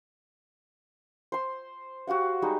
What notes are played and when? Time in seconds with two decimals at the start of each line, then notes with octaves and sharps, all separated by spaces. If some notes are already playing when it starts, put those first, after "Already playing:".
1.32 C5 C6
2.07 F#4 G4 F5 F#5
2.42 G3 G#3 D#4 G4